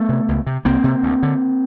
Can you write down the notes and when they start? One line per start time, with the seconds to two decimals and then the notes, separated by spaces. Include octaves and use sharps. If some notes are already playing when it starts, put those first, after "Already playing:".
Already playing: A3 B3
0.09 C3
0.28 C#2
0.47 C3
0.65 C2 A#3 C4
0.84 C3
1.03 D2
1.23 D3